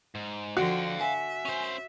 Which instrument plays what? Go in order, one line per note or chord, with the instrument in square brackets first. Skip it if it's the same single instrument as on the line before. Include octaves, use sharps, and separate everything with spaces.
[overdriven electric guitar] G#2
[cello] D3 F3 [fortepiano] F#4 [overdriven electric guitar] F5 G5
[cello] E5 [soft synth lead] G#5
[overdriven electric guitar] C#4 C5